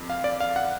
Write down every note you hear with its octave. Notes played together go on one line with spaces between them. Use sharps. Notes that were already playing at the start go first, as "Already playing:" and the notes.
Already playing: F2
F5
D5
F5
F#5